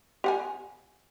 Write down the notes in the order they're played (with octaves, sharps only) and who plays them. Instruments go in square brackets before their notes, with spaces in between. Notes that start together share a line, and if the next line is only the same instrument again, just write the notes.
[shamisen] G4 F#5 G#5